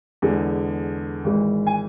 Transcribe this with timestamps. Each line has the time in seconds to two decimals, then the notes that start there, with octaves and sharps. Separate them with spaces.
0.22 E2 D3 G#3
1.24 G#1 G#2 E3 G#3
1.67 G#5